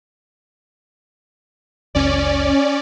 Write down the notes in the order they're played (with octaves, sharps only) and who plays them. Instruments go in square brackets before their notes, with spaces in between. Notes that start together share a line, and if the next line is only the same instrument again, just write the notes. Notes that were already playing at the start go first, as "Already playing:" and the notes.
[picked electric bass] F#1 C#2 [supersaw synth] C#4 D5